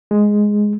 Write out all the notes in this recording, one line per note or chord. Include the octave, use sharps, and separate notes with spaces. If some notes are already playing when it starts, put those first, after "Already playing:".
G#3